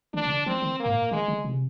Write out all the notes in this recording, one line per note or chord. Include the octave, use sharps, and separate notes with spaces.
D#3 D4
C3
D3
F3 C4
D#3
A#3
G#2
A#2
D#3 G#3
D3
C3